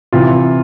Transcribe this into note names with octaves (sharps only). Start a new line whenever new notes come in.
C3 E3 F4